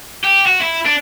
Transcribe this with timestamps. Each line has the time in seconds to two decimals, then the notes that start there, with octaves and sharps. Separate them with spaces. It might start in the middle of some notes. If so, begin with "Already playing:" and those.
0.24 G4
0.46 F#4
0.61 E4
0.86 D4